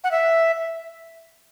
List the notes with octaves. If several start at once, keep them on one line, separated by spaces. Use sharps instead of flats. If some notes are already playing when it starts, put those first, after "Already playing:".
F#5
E5